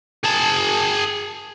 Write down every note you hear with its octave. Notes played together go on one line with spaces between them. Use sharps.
G#4 A5